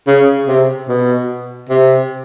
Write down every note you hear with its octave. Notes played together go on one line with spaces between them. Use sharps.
C#3
C3
B2
C3